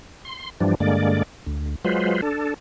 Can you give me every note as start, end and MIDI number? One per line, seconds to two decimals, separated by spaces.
0.25 0.50 84
0.60 0.75 43
0.60 0.75 52
0.60 0.75 53
0.60 0.75 55
0.60 0.75 62
0.80 1.23 43
0.80 1.23 50
0.80 1.23 56
0.80 1.23 58
0.80 1.23 74
1.46 1.75 38
1.85 2.21 54
1.85 2.21 56
1.85 2.21 65
1.85 2.21 71
1.85 2.21 72
2.22 2.54 62
2.22 2.54 69